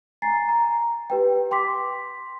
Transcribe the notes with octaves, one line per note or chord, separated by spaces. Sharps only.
G#5 A#5 A6 C7
A#5
G4 B4 G5
G5 C6 D6 B6